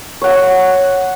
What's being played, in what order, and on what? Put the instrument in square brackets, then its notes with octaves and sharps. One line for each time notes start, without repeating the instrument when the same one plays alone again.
[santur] C#5 F#5